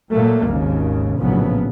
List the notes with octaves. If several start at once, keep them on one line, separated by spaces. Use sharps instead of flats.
A#2 F#3 A3 A#3
G#1 D#2 C#3
A#1 A2 C#3 F#3 B3